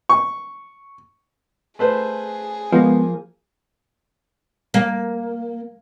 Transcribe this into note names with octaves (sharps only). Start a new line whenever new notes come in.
C#6
A3 G#4 B4 C5
F3 G#3 A#3 B3
A#3